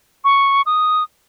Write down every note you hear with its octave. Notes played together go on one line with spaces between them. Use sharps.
C#6
D#6